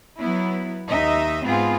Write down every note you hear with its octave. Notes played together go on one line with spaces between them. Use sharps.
F#3 B3 E4
D#2 D#4 D#5 E5
G#2 B3 C4 F4 G#4